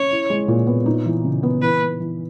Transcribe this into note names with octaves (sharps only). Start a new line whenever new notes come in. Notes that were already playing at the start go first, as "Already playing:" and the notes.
Already playing: C#4 C#5
E4
G#3
A#2
B3
D#4
E3
C#3
B3
E3 B4
B3
E3